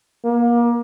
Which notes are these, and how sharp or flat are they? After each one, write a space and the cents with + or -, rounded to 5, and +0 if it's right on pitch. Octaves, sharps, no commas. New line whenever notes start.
A#3 +30